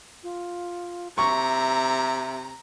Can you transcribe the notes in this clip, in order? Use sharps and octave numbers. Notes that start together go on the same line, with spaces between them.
F4
C3 E5 A#5 C#6